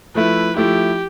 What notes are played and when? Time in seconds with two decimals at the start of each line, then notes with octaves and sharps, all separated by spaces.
0.15 F3 A3 E4 B4
0.56 F3 A3 E4 G4